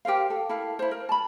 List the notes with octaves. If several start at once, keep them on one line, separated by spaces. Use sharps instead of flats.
G4 A#4 C5 F5
A4
E4 A4 A#4 F5
E4 C5
A#4
A5 B5